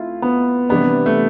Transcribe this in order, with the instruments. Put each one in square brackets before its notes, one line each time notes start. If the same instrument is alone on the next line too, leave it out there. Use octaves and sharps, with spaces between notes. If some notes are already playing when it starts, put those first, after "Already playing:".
Already playing: [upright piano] A3 C4 [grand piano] E4 F4
[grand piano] B3
[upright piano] C3 E3 G3 D4 [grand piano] B3
[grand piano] A3